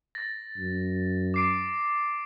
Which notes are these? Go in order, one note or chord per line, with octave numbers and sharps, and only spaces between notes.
A6 A#6
F#2
D6 C7 D7